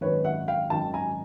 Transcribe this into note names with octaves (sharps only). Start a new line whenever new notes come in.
G#1 F#2 D#3 B4 C#5
E5 F#5
F5 G5
G#1 F#2 D#3 G5 A5
G#5 A#5